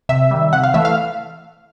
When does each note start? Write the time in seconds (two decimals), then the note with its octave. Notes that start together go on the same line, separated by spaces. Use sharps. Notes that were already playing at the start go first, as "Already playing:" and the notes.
0.09 C3 E5
0.31 D#3 G3
0.53 C3 F#5
0.64 F5
0.74 E3 A3 E5
0.85 F5